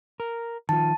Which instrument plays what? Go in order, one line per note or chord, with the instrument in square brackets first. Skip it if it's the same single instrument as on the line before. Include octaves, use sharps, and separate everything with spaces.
[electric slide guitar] A#4
[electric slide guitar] D#3 F3 F4 [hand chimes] A5